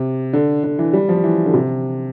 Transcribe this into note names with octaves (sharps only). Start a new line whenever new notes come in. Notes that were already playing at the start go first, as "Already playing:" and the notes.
Already playing: C3
D3
D3
E3
G3
F3
E3
D3
C3